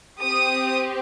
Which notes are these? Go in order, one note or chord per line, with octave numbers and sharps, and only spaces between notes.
C4 G4 D#6